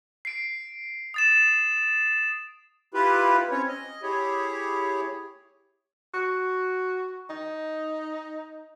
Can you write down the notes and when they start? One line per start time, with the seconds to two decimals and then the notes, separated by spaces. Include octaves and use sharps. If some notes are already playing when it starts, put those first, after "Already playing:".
0.25 C7 D7
1.14 D#6 A6 E7
2.94 E4 F4 G4 B4
3.51 C4 C#4 C#5
3.68 D#5
4.02 E4 G4 G#4 C#5
6.14 F#4
7.30 D#4